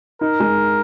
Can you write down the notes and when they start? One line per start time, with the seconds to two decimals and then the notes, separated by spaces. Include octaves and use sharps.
0.21 D#4 A#4
0.40 G#3